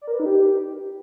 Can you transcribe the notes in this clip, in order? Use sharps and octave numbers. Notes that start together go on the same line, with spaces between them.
D5
A#4
B4
D#4
G4